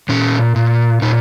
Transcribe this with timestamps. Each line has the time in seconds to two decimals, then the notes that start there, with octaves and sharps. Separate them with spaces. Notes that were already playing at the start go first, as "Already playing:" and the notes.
0.09 A#2 C#4
0.56 A#2
1.02 A#2 D#4